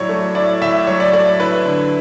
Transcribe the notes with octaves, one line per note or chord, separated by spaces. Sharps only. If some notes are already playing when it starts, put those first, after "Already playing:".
Already playing: A2 F#3 E4 C#5 D5
A3
E4 D5
A2 E5
F#3 C#5
D5
A3 D5
E4 B4
D3